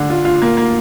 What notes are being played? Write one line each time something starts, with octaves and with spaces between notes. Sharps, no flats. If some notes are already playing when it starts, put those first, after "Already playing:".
Already playing: D3
F4
F4
A#3
A#3